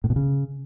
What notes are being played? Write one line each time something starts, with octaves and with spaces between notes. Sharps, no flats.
A2
B2
C#3